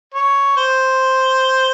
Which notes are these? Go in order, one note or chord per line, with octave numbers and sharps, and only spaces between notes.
C#5
C5